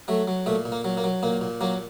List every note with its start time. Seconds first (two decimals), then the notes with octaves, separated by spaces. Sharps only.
0.08 F#3 A3
0.28 F#3
0.46 A#2 A3
0.65 A#2
0.72 A#3
0.85 F#3
0.97 A#3
1.04 F#3
1.23 A#2 A#3
1.41 A#2
1.61 F#3 A#3